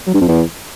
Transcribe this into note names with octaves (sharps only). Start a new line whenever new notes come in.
F#3
G2
F2
E2